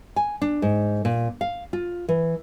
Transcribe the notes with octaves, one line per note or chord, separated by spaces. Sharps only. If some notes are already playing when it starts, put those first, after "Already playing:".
G#5
D4
G#2
A#2
F5
F4
E3